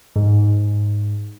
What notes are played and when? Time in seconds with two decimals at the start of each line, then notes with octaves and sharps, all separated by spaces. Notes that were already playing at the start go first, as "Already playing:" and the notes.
0.16 G#2